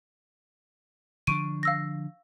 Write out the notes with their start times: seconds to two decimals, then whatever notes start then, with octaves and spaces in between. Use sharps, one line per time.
1.27 D3 F3 D4 C#6 D7 D#7
1.63 F5 E6 A#6